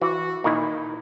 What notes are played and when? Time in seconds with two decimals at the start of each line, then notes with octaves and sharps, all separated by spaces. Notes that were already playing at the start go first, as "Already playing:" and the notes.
0.02 E3 F#4
0.44 A#2 D#3 D#4 E4